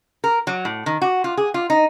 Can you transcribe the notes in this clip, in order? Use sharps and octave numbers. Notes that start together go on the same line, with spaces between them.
A#4
F#3
A2
D#3
F#4
F4
G#4
F4
D#4